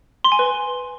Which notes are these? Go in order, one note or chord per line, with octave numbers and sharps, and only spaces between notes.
C6
G#5
B4